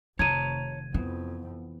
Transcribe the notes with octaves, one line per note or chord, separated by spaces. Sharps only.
F1 D#3 C#5 A5 A#5 G#6 D#7
F2 E3 B3